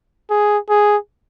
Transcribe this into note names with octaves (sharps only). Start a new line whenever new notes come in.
G#4
G#4